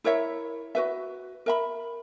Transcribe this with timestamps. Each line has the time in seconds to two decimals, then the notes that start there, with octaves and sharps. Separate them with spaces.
0.04 E4 A#4 C#5 E5
0.75 F#4 B4 E5
1.46 A#4 E5 B5